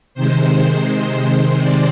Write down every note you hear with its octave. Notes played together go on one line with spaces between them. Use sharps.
C3 D#3 G#3 C5
C5
D5